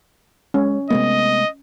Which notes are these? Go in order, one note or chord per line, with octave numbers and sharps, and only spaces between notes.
G#3 C#4
C3 G#3 A3 B3 D#5